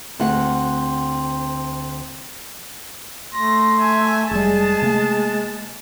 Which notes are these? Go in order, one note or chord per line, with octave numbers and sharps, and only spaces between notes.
D2 C4 F#5
A3 C6 A#6
E5 G#5
F1 G3 G#3 G#4 A5
C3 A3 A#3